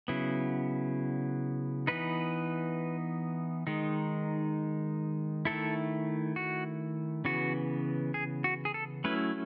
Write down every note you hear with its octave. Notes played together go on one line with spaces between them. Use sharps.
C#3 F#3 B3 E4
E3 B3 D#4 B4
D#3 G#3 D#4
D#3 A3 E4 A4
F#4
C#3 E3 B3 F#4
G#4
F#4
G#4
A4
F#3 A3 C#4 E4 B4